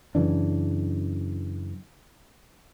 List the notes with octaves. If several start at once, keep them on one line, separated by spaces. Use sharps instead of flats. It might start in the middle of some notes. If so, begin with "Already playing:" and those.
F#2 C#3 E3 D4